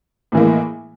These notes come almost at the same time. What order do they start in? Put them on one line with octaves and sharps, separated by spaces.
A2 E3 A#3 G#3